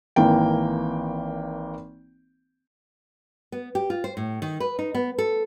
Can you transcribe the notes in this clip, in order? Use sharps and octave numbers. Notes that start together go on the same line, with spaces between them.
G#1 E3 A#3 G5
B3
G4
F4
C5
A2
D#3
B4
D#4
B3
A4